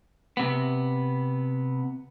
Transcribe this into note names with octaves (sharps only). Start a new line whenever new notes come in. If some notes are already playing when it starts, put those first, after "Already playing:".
C3 B3